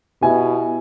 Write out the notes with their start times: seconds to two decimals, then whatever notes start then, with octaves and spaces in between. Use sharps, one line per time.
0.22 B2 E4 G4 G#5